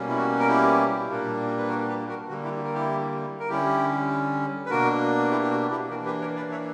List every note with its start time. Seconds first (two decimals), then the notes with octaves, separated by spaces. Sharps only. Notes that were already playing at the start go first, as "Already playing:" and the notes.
Already playing: B2 G3 A#3 C#4
0.08 E4
0.17 F#4
0.40 A#4
0.48 E4 G4
1.08 A#2 G3 A#3 D4
1.58 B4
1.68 F#4 A#4
1.88 G4 B4
2.09 F#4 A#4
2.28 D3 G3 A#3 F#4
2.44 E4 G4
2.65 A#4
2.74 E4 G4
3.40 A#4
3.49 D3 G3 C#4 E4 G4
4.66 B4
4.70 B2 A#3 D4 F#4 A#4
5.31 E4 G4
5.42 G4
5.50 F#4
5.70 E4 G4
5.90 E3 F#4 A#4
5.94 A#3 D4
6.06 G4 B4
6.21 A#4 C#5
6.36 B4 D5
6.51 C#5 E5